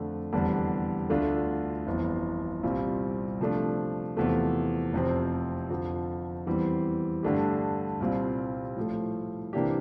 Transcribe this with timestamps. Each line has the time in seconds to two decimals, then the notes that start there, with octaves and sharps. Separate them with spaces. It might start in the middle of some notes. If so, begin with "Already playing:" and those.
Already playing: F2 D3 A3 D4
0.33 F1 E2 D3 G3 D4
1.10 D2 D3 A3 D4 F4
1.86 G1 F2 E3
2.63 C2 A#2 G3 C4 F4
3.40 C3 F3 A3 D4
4.17 E2 C3 F3 A3
4.93 F1 F2 C3 F3 C4
5.70 F2 D3 F3
6.46 E2 E3 G3 C4
7.23 G2 D3 A3 D4 G4
8.00 C2 A#2 G3 C4 F4
8.76 A2 F3 A3
9.53 C3 E3 A#3 D4 G4